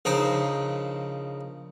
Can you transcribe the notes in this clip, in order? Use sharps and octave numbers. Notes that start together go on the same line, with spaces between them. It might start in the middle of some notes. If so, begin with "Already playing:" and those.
A#1 C#3 D#4 C5 A#5